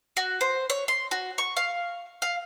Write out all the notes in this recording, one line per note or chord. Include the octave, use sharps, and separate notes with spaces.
F#4
C5
C#5
C6
F#4
C#6
F5
F5